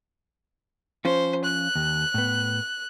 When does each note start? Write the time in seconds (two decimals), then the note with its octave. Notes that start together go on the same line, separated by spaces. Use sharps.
1.05 F3 C#4 F4 C5
1.44 F#6
1.76 D#2
2.14 A2 B3